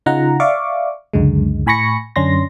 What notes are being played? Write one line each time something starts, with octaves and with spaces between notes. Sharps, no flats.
C#3 D#4 F4 F#5 A#5
D5 E5 F5 C#6 D6
C#2 F#2 D3 G#3
A2 G#5 B5 C#6 A#6 C#7
F#2 D3 C#4 D4 C6 A#6